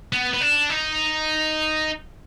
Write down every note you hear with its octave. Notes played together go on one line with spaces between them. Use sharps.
B3
B3
D4
D#4